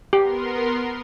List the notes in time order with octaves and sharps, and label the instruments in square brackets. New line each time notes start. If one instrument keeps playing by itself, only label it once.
[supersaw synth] B3 A#4 C6 [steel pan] G4